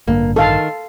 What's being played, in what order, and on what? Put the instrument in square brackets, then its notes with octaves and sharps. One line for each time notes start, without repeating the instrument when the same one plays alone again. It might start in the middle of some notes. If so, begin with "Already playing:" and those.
[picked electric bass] A1 G2 D3 [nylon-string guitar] A#3
[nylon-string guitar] D#3 [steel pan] A4 F5 A5